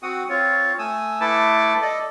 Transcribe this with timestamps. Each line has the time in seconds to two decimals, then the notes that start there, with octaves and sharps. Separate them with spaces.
0.03 C4 F#4 F#5 D#6
0.29 C4 F4 C#5
0.79 A3 G#5 D#6 E6
1.21 A3 E4 A4 B4 A5 D6
1.82 A4 D5 D#5